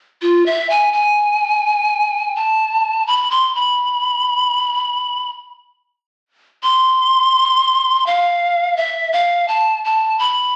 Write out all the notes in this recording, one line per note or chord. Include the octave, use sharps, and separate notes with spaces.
F4
E5
G#5
G#5
A5
B5
C6
B5
C6
F5
E5
F5
A5
A5
B5